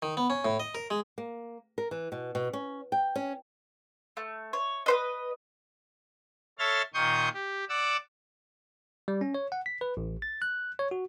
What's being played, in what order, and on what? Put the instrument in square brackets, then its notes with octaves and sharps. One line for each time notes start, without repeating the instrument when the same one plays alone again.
[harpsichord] D#3
B3
C#4
A2
D#5
A#4
G#3
[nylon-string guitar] A#3
A#4
E3
B2
B2
C#4
G5
C#4
[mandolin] A3
C#5
B4 C5 D#5
[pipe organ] A4 C#5 E5 C6 F6 A6
A#2 D#3 C6 C#6 D#6 G6
G4
D5 F#5 D6 E6
[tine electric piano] G3
C#4
C#5
F#5
B6
B4
A1
A6
F#6
C#5
F#4